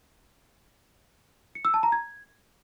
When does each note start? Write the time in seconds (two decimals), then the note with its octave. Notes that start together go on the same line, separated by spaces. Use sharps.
1.55 C#7
1.65 E6
1.74 A5
1.83 A#5
1.92 G#6